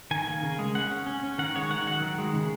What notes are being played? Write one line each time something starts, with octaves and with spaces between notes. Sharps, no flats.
D#3 G#5
A#3
C#3
G#3
C#4 F#5
C#4
C#4
C#4
D#3 F#5
G#3 C#5
D#3 F#5
F#3 F#5
D#3
G#3
C#3